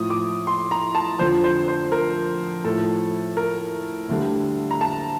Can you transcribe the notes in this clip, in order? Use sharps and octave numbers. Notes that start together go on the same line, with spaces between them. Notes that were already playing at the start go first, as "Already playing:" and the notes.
Already playing: A2 F3 D#6
D6
C6
A#5
A5
F2 D3 F3 C5
C5
C5
A#4
A2 F3 A4
A#4
D2 D3 G3
A#5
A5